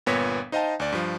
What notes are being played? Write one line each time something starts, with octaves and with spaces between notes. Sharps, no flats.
G1 A#2 B3 C#5 A#6 B6
D#4 C5 D#5 F5 G5 A5
D2 D5
G2 F3